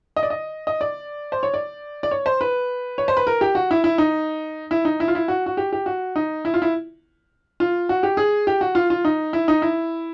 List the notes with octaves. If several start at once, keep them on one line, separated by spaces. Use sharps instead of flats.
D#5
D5
D#5
D#5
D5
C5
C#5
D5
D5
C#5
C5
B4
C#5
C5
B4
A#4
G4
F#4
E4
E4
D#4
E4
D#4
E4
F4
E4
F#4
F#4
G4
G4
F#4
D#4
E4
F4
E4
F4
F#4
G4
G#4
G4
F#4
F4
F4
D#4
E4
D#4
E4